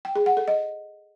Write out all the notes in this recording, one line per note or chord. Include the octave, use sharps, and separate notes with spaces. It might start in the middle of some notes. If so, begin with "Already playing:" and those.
G5
G#4
F#5
A4
D#5